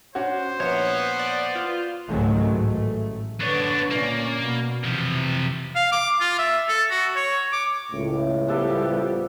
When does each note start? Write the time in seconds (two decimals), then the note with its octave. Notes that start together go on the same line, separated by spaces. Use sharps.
0.15 C#4 D4 F#4 C5
0.60 A#1 B3 C#5
1.19 D5
1.55 F4
2.09 C#2 G#2 D#3 F#3 G#3 A3
2.50 A1 A3
3.41 D3 B3 D4 B4 C#5
3.91 A#2 A#3 C#4 D5
4.40 B2
4.84 C3 E3 F3
5.76 F5
5.92 D6
6.21 F4
6.39 E5
6.68 A4
6.91 F#4
7.16 C#5
7.53 D6
7.92 C#2 A2
8.47 F3 G3 B3 D4 G4 A4